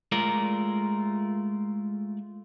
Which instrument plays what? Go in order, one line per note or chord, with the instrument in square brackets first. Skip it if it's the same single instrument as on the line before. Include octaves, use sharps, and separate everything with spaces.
[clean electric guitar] G#3 A3 F4 A#4 D5